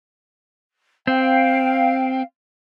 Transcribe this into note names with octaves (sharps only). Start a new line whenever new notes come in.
C4 F5 G5